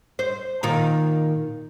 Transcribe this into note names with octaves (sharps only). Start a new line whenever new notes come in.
C5
A#2 D#3 F4